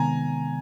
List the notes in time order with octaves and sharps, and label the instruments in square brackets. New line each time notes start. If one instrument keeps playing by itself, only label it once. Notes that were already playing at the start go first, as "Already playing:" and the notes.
Already playing: [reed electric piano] C3 D#3 G#3 B3 [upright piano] G#5 A#5